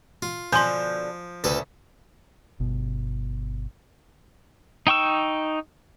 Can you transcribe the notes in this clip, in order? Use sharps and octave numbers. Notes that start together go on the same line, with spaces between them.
F4
B2 D3 F3 G#5 C6 G6
D2 C#3 A3 A4 B4
G1 B2
D#4 G5 C#6 E6